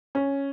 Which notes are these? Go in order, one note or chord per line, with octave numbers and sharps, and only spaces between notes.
C#4